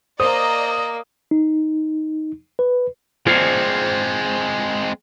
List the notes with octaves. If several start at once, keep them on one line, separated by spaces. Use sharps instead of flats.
A#3 C5 D5 D#5 A#5 D#6
D#4
B4
G#3 C4 F4 G#4 C5